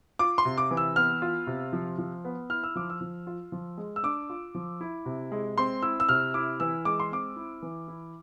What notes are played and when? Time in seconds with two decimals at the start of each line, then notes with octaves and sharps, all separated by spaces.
0.19 F4 D6
0.38 C6
0.45 C3
0.58 D6
0.71 E3
0.77 E6
0.96 B3 F6
1.22 F4
1.47 C3
1.73 F3
1.98 F3
2.25 B3
2.50 E4 F6
2.63 E6
2.76 F3 D6
2.90 E6
3.01 F3
3.27 F4
3.52 F3
3.78 G#3
3.96 E6
4.03 D4 D6
4.29 F4
4.55 F3
4.81 E4
5.06 C3
5.32 G#3
5.57 C4 C6
5.82 E4 E6
6.00 E6
6.09 C3 F6
6.34 E4 D6
6.60 E3 E6
6.85 G#3 D6
7.00 C6
7.11 C4 D6
7.36 E4
7.63 E3
7.88 E4